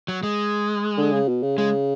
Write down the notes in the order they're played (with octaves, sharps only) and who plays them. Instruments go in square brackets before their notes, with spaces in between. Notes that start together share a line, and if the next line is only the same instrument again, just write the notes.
[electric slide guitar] F#3
G#3
[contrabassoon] D3
C#3
B2
C#3
[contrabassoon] C#3 [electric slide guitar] G#3